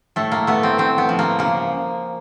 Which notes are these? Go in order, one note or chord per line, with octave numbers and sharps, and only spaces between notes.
A2 A3
A#3
A3 B3
C4
A2 C4
B3
F3
A#3
C#3 A#3